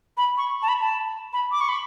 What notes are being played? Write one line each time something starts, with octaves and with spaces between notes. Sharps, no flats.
B5
C#6
A5
B5
A5
B5
D6
C#6
B5